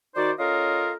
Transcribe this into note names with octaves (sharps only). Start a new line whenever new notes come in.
D#3 D#4 F#4 C5 D5
C#4 F4 A4 A#4 D#5 F5